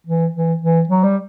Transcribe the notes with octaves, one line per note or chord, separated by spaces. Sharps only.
E3
E3
E3
F#3
G3